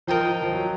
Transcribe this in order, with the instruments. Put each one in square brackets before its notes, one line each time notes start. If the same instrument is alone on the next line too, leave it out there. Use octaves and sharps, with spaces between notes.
[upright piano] F3 [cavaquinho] A#4 D#5 G5
[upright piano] F3
F#3